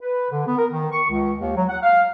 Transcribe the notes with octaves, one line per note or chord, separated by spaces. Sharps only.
B4
D3
B3
A#4
D#3
C#6
C#2
D#2
F#3
F#5
F5